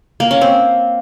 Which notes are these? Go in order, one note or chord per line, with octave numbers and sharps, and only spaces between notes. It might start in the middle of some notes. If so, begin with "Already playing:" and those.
A#3
C#4
C4